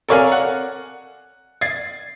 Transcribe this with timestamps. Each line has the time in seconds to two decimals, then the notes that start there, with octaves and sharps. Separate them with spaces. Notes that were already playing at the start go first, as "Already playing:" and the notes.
0.09 A4 A#4 C#5 D5 F5 G#5
0.32 F#5
1.61 G#6 A6 C7